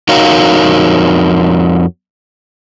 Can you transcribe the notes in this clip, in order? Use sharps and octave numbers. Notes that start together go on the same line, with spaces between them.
F2 D#4 F#4 A#4 C#5 F5